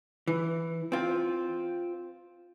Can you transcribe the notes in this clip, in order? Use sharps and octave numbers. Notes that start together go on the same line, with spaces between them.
E3
C4 F4